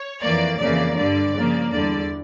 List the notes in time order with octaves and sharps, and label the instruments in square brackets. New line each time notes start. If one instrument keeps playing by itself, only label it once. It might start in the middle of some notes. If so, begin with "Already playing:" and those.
Already playing: [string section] C#5
F2 E3 A#3 D5
F2 C#3 E3 A#3 D5
G2 D3 G3 D5
C#3 F3 A#3
E2 D3 G3 D5